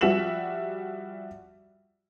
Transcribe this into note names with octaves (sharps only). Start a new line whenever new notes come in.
F3 G3 F#4 E5 E7 F#7